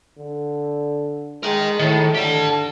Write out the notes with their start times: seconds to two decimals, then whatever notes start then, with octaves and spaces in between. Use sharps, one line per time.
0.18 D3
1.43 G#3 A#4 D#5
1.79 A2 D#3
2.15 D3 G4 A5